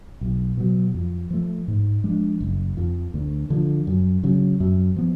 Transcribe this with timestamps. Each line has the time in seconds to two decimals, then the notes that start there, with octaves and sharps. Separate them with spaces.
0.21 B1
0.57 B2 F#3
0.94 F2
1.30 F3 A3
1.68 G#2
2.04 F3 G#3 D4
2.40 F#1
2.77 F2 F3
3.14 D2
3.50 D3 F3
3.87 F#2
4.23 C#3 F#3
4.60 F#2
4.96 F3 B3